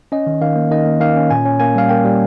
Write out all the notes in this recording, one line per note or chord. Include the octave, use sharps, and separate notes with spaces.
C#4 D#5
D#3
D#3 F5
A#3
D#3 D#5
A#3
D#3 F5
C#4
A#2 G#5
C#4
A#3 G#5
G3 F5
A#3 G5
G3